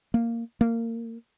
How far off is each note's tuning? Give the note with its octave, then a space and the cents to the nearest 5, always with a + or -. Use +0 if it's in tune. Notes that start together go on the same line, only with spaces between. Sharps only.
A#3 -10
A#3 -20